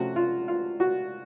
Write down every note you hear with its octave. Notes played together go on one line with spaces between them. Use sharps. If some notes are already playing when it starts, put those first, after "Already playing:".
Already playing: C3 F3 A3 C#4 F#4
F4
F4
F#4